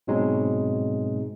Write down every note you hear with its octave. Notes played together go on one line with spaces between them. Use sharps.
G#2 B2 F#3 G#3 C4 D#4